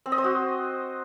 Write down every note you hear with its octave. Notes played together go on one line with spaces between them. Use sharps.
C4
D#5
C5
F#4